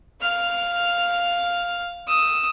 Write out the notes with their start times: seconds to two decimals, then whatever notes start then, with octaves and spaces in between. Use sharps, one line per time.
0.21 F5 F6
2.08 D#6 E6